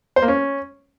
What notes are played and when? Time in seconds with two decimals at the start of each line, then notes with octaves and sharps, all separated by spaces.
0.16 C5
0.22 A#3
0.28 C#4